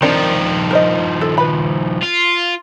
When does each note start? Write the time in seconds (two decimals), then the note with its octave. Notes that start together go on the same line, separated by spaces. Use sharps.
0.02 D#3 F3 C4 D4 A#4
0.71 A#4 C5 D#5
1.21 A4
1.38 B4 B5
2.03 F4